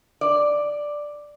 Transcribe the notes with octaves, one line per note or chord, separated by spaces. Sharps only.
D5